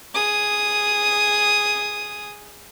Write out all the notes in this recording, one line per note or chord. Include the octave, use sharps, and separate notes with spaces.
G#4 D#6